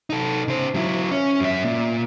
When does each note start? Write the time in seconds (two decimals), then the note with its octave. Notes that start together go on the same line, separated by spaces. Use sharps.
0.10 D#4 A4
0.48 C#3 C5
0.74 F#3 E4
1.12 C#4
1.40 F#2 E5
1.65 A#2